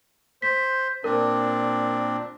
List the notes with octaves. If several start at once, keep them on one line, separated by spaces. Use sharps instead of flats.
C5 B6
A#2 C4 D4 A#4